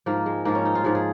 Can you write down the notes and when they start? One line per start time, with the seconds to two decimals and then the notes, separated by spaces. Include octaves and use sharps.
0.06 G#2 F3 A#3
0.26 G#3
0.45 G#2 F3 A#3
0.55 C#4
0.65 D#4
0.75 F4
0.84 G#2 F3 G#4
0.95 G#4